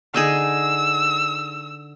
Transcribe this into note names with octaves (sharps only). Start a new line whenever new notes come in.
D3 D#4 G#4 E6